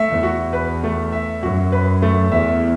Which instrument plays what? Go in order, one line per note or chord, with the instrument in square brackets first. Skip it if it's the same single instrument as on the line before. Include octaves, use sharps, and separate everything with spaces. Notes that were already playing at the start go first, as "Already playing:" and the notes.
Already playing: [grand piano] A3 E5
[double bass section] E2
[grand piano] F#4
B4
A3
E5
[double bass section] F#2 [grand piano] F#4
[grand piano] B4
A3
[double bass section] E2 [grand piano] E5